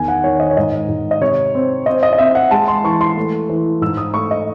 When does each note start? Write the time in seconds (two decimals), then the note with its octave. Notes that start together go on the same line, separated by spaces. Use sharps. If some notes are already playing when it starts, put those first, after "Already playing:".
Already playing: E2 D#3 G#5
0.08 F#5
0.23 D#3 C#5
0.40 D#5
0.51 C#5
0.57 G#2 D#5
0.88 G#2
1.11 D#5
1.21 C3 C#5
1.55 C4
1.86 C4 D#5
2.03 D#5
2.13 D#5
2.18 C4 E5
2.35 F#5
2.51 G#3 A5
2.68 C6
2.84 E3 C#6
3.01 C6
3.17 A3
3.49 E3
3.81 G#2 E6
3.97 D#6
4.14 A3 C#6
4.31 D#5